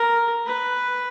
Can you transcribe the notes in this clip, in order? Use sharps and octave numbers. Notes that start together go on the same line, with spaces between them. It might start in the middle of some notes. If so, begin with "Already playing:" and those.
Already playing: A#4
B4